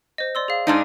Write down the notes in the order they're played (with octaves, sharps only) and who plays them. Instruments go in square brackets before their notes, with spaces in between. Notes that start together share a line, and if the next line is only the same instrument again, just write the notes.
[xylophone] C5 D#5
D5 C6 E6
G#4 F5
[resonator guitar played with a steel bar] G#2 D4 D#4